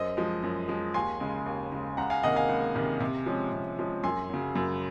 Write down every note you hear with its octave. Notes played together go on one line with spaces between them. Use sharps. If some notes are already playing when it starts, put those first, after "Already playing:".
Already playing: F#2 C5 D#5
F3 G#3
F#2
F3 G#3
D#2 G#5 C6
C#3 G#3
D#2
C#3 G#3
C#2 F#5 A#5
F5 G#5
C3 D#3 A#3 D#5 F#5
F5 G#5
C#2
C3 D#3 A#3
C3
F3 G#3 C#4
C3
F3 G#3 C#4
F#2 G#5 C6
C#3 F#3
F#2